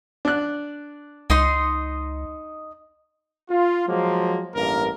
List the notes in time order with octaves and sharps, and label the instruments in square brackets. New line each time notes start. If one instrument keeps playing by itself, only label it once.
[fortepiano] D4 F#6
[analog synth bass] C#2 [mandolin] D#4 D#5 C6
[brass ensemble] F4
F3 F#3 G#3 A#3
A1 G2 A#3 A#4